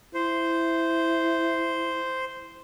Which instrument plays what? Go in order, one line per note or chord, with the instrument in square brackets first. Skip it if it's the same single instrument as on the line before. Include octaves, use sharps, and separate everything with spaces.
[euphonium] E4 [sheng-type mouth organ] C5